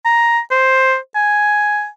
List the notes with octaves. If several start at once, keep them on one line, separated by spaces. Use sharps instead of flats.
A#5
C5
G#5